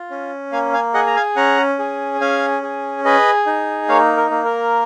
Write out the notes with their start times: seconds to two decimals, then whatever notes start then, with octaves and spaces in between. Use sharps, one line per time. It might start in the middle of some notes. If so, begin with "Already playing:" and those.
Already playing: F4
0.10 C#4
0.52 A#3 F5 G#5
0.73 F5 G#5
0.94 G#4 D#5 F#5
1.07 A#5
1.16 F5 G#5
1.36 C#4 F#5 A#5
1.79 G#4
2.21 C#4 F5 G#5
2.62 G#4
3.05 G#4 B4 D#5
3.46 D#4
3.88 A#3 C#5 F5
4.17 A#4
4.31 A#3
4.45 A#4